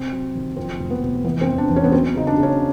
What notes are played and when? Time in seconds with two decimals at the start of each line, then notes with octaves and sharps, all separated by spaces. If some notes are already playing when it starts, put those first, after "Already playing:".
Already playing: C3 C4
0.12 F#3
0.35 D#3
0.56 F2 C4
0.79 F1
0.90 B3
1.03 F1
1.24 E3 B3
1.41 C4
1.48 E2
1.58 D4
1.70 E2
1.76 C#4
1.84 B3
1.92 F#3 C4
2.16 C#3 D#4
2.27 D4
2.37 C#3
2.43 C#4